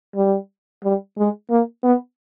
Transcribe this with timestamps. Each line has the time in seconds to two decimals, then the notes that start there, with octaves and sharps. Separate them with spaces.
0.15 G3
0.83 G3
1.17 G#3
1.50 A#3
1.83 B3